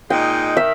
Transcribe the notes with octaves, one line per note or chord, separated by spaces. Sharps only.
A#2 G#3 D#4 G5
D#3 E5